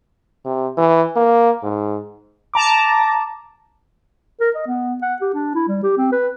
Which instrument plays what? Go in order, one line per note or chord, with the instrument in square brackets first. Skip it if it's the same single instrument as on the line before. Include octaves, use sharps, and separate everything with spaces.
[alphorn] C3
E3
A#3
G#2
[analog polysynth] A5 A#5 D6
[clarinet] A#4
D#5
B3
F#5
G4
D4
E4
G3
G4
C4
B4